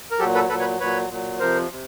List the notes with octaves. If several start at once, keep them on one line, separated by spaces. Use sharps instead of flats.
A#4
A#2 F#3 G4 A4
A4 B4
A#2 F#3 A4 B4
B4 C#5
A#2 F#3 B4 C#5
A#2 F#3
F2 C3 F3 A#4 C5
C3